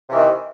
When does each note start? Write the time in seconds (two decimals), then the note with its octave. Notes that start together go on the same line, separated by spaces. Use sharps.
0.09 C3
0.12 E3
0.15 D#3